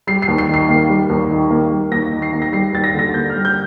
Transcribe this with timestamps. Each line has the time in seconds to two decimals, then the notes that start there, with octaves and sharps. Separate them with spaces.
0.07 G3 C7
0.22 C7
0.28 D#2
0.38 C7
0.49 D#3 C7
0.69 A#3
0.89 G3
1.10 D#2
1.30 D#3
1.50 A#3
1.71 G3
1.92 D#2 A#6
2.12 D#3
2.22 C7
2.33 A#3
2.42 A#6
2.53 G3 C7
2.73 D#2 A6
2.84 A#6
2.94 D3 A#6
3.14 A#3 G6
3.30 G3 F6
3.45 G6